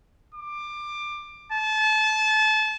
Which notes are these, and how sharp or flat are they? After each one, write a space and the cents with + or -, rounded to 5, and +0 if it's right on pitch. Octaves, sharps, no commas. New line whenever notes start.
D6 +20
A5 -30